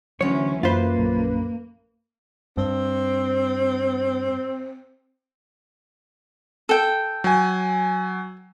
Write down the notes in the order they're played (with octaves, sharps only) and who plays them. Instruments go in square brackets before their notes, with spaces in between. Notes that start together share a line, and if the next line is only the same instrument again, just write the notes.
[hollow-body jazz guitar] D2 C#5 [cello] E3 C#4 [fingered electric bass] F#3
[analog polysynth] F#2 B4 [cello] A#3 [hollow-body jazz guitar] F4 C5
[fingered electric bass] A#1 F#3
[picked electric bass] G2 [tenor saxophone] C4
[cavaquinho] A4 G5
[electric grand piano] F#3 G#5